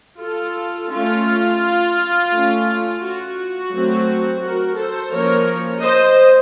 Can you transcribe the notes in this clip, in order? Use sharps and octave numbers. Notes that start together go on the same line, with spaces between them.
F4 A4
A3 C#4 F4
A3 C#4
F#4
F#3 A3 C4
F#4 A#4
A4 C5
F3 A#3 C#4 A#4 C#5
C5 D#5